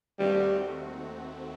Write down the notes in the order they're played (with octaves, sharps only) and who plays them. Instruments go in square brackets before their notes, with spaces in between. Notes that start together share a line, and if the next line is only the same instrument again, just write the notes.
[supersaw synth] D#2 D#3 A3 C4 F#4 [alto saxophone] G3